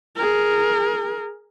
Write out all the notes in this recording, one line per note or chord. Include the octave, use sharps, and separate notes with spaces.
G#4 A#4